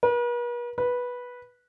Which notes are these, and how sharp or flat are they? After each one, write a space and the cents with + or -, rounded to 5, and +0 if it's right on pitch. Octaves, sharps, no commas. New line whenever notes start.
B4 -45
B4 -10